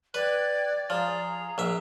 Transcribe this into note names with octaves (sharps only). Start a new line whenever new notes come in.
B4 D5 G5 F#6 G#6
F3 G#4 A#5
A#1 E5